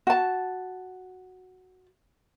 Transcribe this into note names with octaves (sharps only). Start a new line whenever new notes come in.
F#4 A5